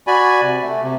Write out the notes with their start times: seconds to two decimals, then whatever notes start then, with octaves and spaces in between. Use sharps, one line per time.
0.07 F#4 D5 G#5 B5
0.42 C3
0.63 A3
0.83 C3